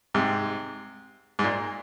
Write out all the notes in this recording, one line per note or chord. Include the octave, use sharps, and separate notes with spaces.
G#2 C3
G#2
A#2